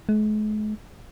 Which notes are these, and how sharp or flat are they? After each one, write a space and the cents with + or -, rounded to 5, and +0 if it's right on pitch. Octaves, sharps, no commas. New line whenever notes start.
G#3 +45